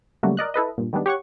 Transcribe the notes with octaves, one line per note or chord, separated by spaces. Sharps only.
C#3 F#3 G3 A3 A#3 F#4
A#4 D5 D#5 F#6
E4 A4 B4 D#5
G2 A#2
D#3 G3 G#3 B3 D4
G4 C#5 F#5 C#6